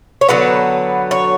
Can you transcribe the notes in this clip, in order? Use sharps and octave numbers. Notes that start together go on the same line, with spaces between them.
C#5
D3 F#3 B3 B4
C#5